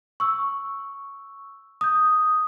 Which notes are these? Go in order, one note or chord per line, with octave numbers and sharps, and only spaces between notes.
C#6 E6
D#6 G6